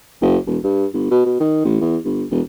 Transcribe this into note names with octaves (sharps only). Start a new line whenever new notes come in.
F#1
E1
G2
G1
B2
B2
D#3
A1
E2
G1
E1